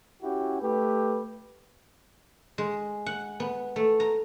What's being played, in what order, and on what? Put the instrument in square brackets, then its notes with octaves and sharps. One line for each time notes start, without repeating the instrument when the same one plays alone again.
[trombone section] C#4 E4 F#4 G4
A3 G4 B4
[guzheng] G#3
F#5
B3
A3
A#5